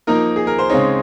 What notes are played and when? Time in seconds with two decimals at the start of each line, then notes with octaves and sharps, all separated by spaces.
0.07 F3 A#3 D#4 A#4
0.36 G#4
0.47 A#4
0.59 C5
0.70 C#3 G#3 C4 D#4 C#5